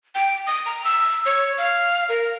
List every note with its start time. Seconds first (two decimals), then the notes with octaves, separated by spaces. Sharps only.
0.15 G5
0.47 D#6
0.66 A#5
0.84 E6
1.26 C#5
1.58 F5
2.09 A#4